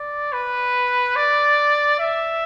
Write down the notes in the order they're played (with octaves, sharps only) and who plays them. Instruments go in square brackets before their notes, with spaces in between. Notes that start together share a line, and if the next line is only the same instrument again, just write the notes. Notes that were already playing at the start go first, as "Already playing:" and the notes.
Already playing: [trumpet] D5
B4
D5
E5